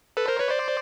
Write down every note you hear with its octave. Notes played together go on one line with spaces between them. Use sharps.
A4 B4
A#4 C5
B4 C#5
C5 D5